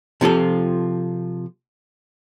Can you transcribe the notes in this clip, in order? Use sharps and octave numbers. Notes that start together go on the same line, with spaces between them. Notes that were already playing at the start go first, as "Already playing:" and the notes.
C3 F3 F4 A4